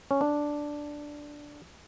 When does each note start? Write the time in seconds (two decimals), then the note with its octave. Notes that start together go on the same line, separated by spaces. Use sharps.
0.11 C#4
0.21 D4